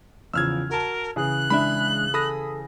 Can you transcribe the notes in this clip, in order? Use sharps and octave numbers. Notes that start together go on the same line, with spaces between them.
E2 C#3 F3 E6 F6 G#6
F#4 A#4 A5
C#3 E3 G#4 F#6
G#3 D4 E5 B5
A4 B5 D#6 A#6